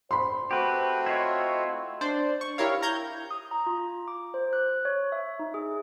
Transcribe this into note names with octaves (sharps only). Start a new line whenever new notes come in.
C5 B5 C6
A3 C4 F#4 G4 B4
E4 F4 C#5 D#5
D4 C5 D5
C#6
E4 G4 A#4 C#5 F5
A#5 G6 G#6
D#6
A#5
F4
D6
C5
F#6
C#5
E5
D#4
G#4